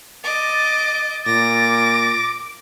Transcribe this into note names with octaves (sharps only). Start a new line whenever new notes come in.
D#5 D6 A6
A#2 D6 A#6